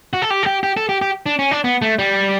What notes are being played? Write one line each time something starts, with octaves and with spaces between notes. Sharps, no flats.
F#4
A4
G4
A4
G4
G4
A4
G4
G4
D4
C#4
D4
B3
A3
G3